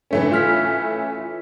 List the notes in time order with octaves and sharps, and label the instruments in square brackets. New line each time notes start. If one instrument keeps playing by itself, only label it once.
[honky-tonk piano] E3 A3 C#4
[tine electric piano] F4 F6 B6